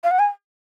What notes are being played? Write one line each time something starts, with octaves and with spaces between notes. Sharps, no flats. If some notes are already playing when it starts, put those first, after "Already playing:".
F5
F#5
G#5